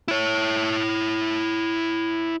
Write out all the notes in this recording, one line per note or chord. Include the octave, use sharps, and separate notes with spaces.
E4 C#5